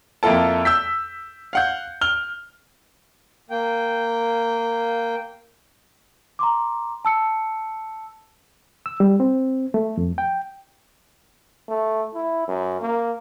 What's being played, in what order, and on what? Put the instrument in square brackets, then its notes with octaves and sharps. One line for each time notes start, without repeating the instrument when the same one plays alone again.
[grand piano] F2 A#3 E4 F4 A4 A5
E6 G6 B6
F5 F#5 G6
F6 G7
[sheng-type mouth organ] A#3 G5
[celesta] A#5 C6 D6
A5 E6 C#7
[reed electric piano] E6
G3
C4
A3
F2
G5
[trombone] A3
E4
F#2
A#3